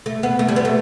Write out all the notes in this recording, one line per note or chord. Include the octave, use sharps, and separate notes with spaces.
A3
B3
A3
G3
B3
A3